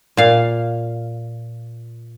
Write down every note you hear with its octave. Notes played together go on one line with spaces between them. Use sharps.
A#2 F5